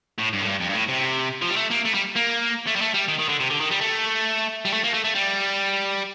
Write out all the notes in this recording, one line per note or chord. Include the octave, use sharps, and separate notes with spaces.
A2
G2
A2
G2
F2
G2
A2
C3
F3
G3
A3
A#3
A3
G3
A#3
A3
G3
A3
G3
D#3
D#3
D3
C3
D3
D#3
G3
A3
G3
A3
A#3
A3
A3
G3